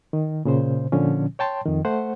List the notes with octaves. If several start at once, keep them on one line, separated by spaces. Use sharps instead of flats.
D#3
A#2 C#3 C5
A#2 D3 F3 C#4
C#5 G5 A5 C6
F2 D#3
A3 C5 F#5